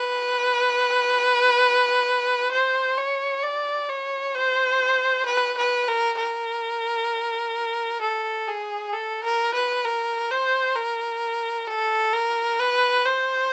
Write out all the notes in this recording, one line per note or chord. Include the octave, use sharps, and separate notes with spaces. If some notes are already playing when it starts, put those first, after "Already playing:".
Already playing: B4
C5
C#5
D5
C#5
C5
B4
B4
A#4
A#4
A4
G#4
A4
A#4
B4
A#4
C5
A#4
A4
A#4
B4
C5